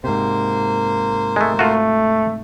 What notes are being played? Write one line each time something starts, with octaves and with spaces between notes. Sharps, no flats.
G#2 C3 A#3 C5
G#3 A3
A3 F4 F#4